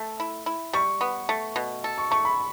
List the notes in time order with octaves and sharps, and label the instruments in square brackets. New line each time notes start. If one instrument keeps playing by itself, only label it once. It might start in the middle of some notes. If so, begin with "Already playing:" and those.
Already playing: [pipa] A3 A4
E4
E4
[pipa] G3 [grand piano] C#6
[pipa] B3
A3
B2
A4
[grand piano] C#6
[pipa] A3 [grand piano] C#6
[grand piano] B5